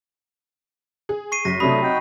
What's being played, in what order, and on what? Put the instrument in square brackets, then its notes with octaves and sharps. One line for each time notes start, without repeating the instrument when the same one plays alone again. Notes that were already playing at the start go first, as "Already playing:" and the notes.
[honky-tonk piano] G#4
[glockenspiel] C#6 C7 D#7
[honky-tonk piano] F#2 [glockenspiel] A#6 B6
[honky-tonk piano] C3 F#3 D#6 [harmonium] A3 D4 [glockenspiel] B5
[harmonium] D#4 F#4 G5